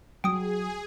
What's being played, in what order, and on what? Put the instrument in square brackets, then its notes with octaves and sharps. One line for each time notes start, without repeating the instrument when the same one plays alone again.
[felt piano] F#3 [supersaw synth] G#4 [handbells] G5 D#6